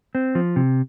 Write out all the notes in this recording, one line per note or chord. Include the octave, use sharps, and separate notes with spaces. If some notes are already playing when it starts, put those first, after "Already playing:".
C4
F3
C3